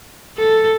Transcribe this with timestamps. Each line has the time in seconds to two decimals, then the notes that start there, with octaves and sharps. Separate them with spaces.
0.38 A4